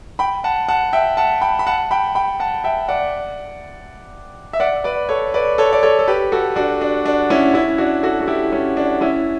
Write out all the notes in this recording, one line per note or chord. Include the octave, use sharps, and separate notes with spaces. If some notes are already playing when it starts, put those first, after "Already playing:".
G5 B5
F#5 A5
F#5 A5
E5 G5
F#5 A5
G5 B5
B5
F#5 A5
G5 B5
G5 B5
F#5 A5
E5 G5
D5 F#5
E5
D5 F#5
B4 D5
A4 C#5
B4 D5
A4 C#5
D5
A4 C#5
A4
G4 B4
F#4 A4
D4 F#4
D4
D4
C#4 E4
C#4 E4
D4 F#4
F#4 A4
F#4
E4 G4
C#4
D4
C#4 E4